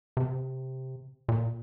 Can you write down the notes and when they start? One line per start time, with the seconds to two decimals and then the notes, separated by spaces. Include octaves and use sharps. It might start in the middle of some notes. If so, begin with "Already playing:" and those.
0.17 C3
1.29 A#2